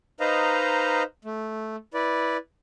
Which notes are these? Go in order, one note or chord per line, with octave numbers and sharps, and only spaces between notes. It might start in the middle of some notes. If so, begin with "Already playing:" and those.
D#4 B4 C5 D#5 F5 A#5
A3
E4 B4 D5